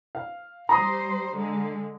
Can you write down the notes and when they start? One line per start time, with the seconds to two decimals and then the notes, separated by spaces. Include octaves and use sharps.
0.15 F5
0.69 G3 C5 A#5 D#6
1.34 D3 G#3